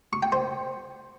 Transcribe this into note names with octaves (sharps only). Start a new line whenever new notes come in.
C#6
G5
C5